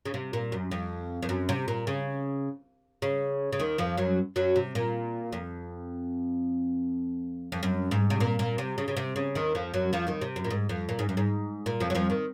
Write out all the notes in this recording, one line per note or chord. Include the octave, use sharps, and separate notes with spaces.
C#3
C3
A#2
F#2
F2
F2
F#2
C3
A#2
C#3
C#3
C#3
D#2 D#3
F2 F3
F#2 F#3
F#2 F#3
C3
A#2
F2
F2
F#2
G#2
C3
A#2
A#2
C3
C#3
C#3
C3
C#3
D#2 D#3
F2 F3
F#2 F#3
F2 F3
D#2 D#3
C3
F#2
A#2
G#2
F2
A#2
G#2
F#2
G#2
A#2
F2 F3
F#3
F2 F3
D#3